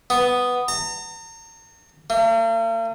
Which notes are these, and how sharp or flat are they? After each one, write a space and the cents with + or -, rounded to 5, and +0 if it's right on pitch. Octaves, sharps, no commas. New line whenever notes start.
B3 +5
A#5 -40
A#3 -45